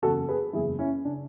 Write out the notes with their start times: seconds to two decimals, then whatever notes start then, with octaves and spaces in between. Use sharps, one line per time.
0.02 F#1 E2 C#3 F#4 A4
0.29 G#4 B4
0.53 F#1 E2 C#3 E4 G#4
0.79 C#4 E4
1.05 C#3 D4